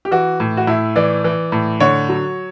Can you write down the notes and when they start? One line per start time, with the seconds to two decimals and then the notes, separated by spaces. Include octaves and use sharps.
0.05 G4
0.11 E3 F#4
0.40 A2
0.57 F#4
0.67 A2 E4
0.96 E3 D5
1.24 E3
1.52 A2
1.80 D3 C#5
2.09 F#3